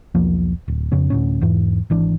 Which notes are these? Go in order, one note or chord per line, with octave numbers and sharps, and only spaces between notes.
B1 E2 F3 A#3
D1
F2 C#3 B3 C#4
D2 A2 C#4
E2 G#2 E3
G#1 E3 D4